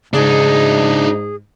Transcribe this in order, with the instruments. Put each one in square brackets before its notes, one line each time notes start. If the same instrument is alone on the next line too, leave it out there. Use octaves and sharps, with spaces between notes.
[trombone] G#2 [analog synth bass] C#3 [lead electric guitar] D4 D#4 [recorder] G#4